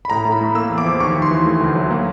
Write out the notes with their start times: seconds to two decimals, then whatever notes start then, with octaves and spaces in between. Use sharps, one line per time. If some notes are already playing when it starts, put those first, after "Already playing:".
0.05 B5
0.10 A2 A#5
0.25 A2
0.32 B5
0.41 A3
0.55 A#3 E6
0.70 E2
0.78 D6
0.85 F3
1.00 D#2 C#6
1.15 D#2
1.22 C6
1.31 E3
1.46 A3
1.60 D2
1.75 F#3
1.91 A#3